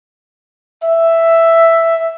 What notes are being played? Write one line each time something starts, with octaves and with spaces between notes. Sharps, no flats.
E5